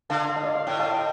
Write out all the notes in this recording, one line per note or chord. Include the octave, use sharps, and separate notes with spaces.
D3 F5 A5
F5
D#5
D5 F5
F5
A2 D#5 G5
F5 A5
D#5 G5